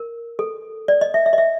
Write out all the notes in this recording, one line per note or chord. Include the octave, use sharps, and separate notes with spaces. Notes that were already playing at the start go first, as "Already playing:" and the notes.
Already playing: A#4
A4
D5
D#5
E5
E5
D#5
E5